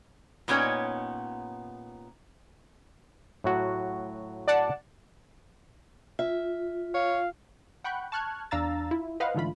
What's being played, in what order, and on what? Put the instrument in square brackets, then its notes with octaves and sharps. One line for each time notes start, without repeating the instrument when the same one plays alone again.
[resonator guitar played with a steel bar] A#2 B3 C#4 D#4 G4 C#5
[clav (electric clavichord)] A2 F#3 F#4
[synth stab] D5 F#5 A5
[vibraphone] F4 [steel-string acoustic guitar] E5
[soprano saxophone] C#5 [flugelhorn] F5
[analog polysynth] F#5 G5 B5 C#6 F#6 G6
A5 C#6 F6 F#6 G#6
E2 D4 F5 A#5 E6 A6
E4 F4
B4 C5 D#5 F5 F#5
G#2 D3 E3 A3 F4 B5